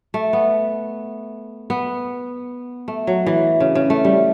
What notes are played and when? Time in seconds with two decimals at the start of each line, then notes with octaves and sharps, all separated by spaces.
0.14 A3
0.33 B3
1.70 B3
2.88 A3
3.07 F#3
3.26 E3
3.60 C#3
3.75 C#3
3.90 A3
4.05 G3